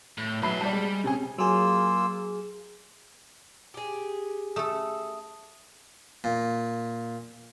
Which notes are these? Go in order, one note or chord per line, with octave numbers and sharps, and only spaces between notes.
A2
B1 B4 E5 B5 C7
G3 D5 A5
G#3
C3 C#4 G#4
F#3 A#3 F4 G#4 E6
G4 G#4
A3 A4 D#6
A#2